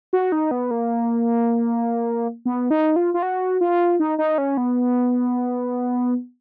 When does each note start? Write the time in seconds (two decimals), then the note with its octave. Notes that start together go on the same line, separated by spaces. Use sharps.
0.13 F#4
0.32 D#4
0.51 B3
0.71 A#3
2.46 B3
2.71 D#4
2.96 F4
3.14 F4
3.23 F#4
3.61 F4
4.00 D#4
4.18 D#4
4.38 C#4
4.57 B3